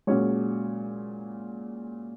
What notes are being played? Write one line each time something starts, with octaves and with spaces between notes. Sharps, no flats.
A#2 F#3 G#3 C#4 G#4 C#5